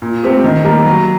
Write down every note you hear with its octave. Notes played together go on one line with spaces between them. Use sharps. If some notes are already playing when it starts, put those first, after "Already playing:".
A#2
A3 C4 G4
D#3
G3 A#3
F#3